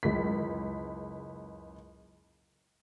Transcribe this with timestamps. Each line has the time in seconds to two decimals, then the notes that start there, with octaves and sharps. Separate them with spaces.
0.03 F#1 C#2 B6